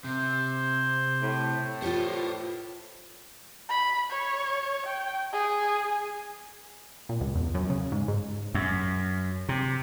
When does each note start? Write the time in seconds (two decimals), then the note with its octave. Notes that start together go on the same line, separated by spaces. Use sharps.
0.04 C3 C5
1.21 A2
1.82 F4 G4 C5 C#5
3.69 B5
4.11 C#5
4.87 G5
5.33 G#4
7.09 A#2
7.21 C#2
7.35 E2
7.55 F#2
7.70 C#3
7.92 G#2
8.08 G#2
8.55 F#2
9.49 C3